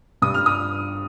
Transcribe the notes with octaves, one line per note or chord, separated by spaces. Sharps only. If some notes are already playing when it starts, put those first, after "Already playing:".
G2 D#6
F6
D#6